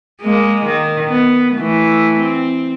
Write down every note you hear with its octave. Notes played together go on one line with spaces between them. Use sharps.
G#3 A#3
D#3
B3
E3 A3
C4